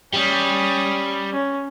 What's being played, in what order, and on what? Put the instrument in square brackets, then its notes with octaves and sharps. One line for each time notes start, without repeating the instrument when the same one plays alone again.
[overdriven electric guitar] G3 [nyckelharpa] C#4 D#6
[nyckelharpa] C#4